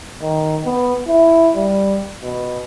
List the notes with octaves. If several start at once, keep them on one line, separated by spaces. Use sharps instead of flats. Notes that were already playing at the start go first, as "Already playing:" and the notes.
D#3
B3
E4
G3
B2